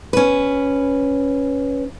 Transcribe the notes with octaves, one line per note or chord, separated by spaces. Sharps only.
C#4 B4